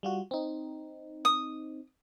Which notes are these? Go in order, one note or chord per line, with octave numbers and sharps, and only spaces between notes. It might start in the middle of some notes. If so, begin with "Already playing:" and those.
G3 F4 F#4
C4 D#4
D#6